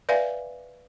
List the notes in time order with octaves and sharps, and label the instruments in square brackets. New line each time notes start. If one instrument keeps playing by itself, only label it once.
[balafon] B4 D5 E5 F5 G#5